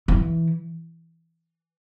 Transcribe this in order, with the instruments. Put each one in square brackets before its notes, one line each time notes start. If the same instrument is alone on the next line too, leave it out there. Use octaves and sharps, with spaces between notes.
[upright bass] E3